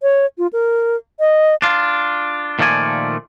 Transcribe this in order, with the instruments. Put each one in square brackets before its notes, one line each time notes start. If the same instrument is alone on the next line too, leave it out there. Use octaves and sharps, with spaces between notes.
[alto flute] C#5
F4
A#4
D#5
[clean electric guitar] D4 F4
A#2 D#3 F3 A3 D5 G#5